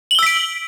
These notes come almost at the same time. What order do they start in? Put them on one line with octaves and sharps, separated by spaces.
F#7 G7 E6 B6 D7